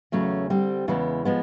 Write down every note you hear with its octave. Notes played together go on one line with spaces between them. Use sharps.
E2 C#3 F#3 A3 C#4
D3 G3 C4
E2 C#3 E3 G#3 B3
F3 G#3 B3